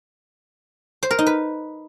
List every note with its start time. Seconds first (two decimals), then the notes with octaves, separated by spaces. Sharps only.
1.03 C5
1.11 A#4
1.19 D#4
1.27 B4